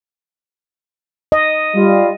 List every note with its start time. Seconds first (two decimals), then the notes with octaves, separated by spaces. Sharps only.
1.32 D#5
1.76 G3 F4